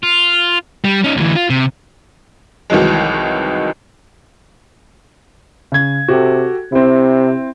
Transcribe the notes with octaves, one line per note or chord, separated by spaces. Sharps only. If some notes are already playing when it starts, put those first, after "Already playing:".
F4
G3
C#4 D#4
D2 E3
F4
C3
C2 D#3 E3 F#3 G#3
C#3 G#6
C3 F#4 G4 A4
C3 C4 E4